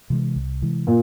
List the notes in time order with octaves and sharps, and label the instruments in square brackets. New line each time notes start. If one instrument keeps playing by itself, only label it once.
[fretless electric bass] C3 E3 G#3
C2
C3 E3 G#3
[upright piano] A#2